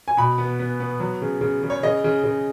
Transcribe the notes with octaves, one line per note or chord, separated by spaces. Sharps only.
G#5
B2 B5
B3
B3
B3
F#3
C#3
C#3
C#3
C#5
C#3 D#5
C#3
C#3